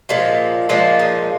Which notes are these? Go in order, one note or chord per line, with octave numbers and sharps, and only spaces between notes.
A#2 F3 G#3
A#2 F3 G#3 D4
D#4